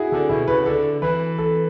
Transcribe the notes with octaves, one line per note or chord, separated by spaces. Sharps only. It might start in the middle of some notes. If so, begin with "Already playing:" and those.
Already playing: E4 F#4 G#4
D3 A4
B2 E4
C#3 B4
D3 A4
E3 B4
A4